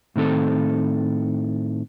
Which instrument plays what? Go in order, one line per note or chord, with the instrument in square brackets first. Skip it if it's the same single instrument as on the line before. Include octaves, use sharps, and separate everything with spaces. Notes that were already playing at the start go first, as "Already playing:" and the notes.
[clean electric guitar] A2 D#3 C4 A4